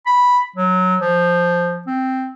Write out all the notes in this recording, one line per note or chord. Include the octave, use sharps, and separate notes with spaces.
B5
F#3
F3
C4